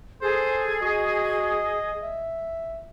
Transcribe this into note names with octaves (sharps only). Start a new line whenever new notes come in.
G#4 A4 C5
F#4 D#5
E5